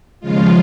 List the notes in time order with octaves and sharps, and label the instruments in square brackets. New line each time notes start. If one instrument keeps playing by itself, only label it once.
[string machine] D#2 C#3 F3 G#3 F4